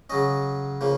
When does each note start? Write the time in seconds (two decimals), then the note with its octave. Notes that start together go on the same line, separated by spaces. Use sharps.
0.10 C#3 F#3 C#4 D#5
0.81 C#3 F3 A#3